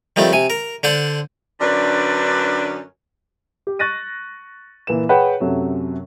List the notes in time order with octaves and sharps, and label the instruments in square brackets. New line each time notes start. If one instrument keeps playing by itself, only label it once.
[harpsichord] D#3 F3 G3 A3 C4
C3 G#5
A#4
D3 D4 C5 F#5 C6
[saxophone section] F#2 D3 C#4 D4 B4 D5
[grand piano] G4
C#6 F#6 A6 A#6 D#7
A#2 E3 A#3 B4 E7
G#4 B4 C#5 F#5 G5
F#2 C3 F#3 A3